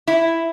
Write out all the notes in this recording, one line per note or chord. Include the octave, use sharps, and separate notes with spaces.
E4